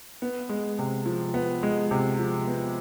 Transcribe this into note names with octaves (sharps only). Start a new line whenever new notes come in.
B3
G#3
C3
F3
B3
G#3
C3
F3
B3